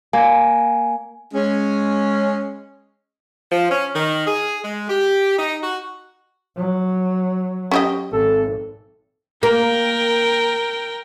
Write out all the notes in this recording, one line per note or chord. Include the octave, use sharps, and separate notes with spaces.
A#3 G#5
G#3 C#4
F3
C#4
D#3
G#4
G#3
G4
D#4
F#4
F#3
C#4 G4 D#5
G#1 A4
A#3 A#4 G5